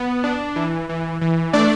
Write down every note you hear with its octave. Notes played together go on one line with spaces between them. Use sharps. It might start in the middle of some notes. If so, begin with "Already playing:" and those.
Already playing: B3
D4
E3
E3
E3
A3 D4 D5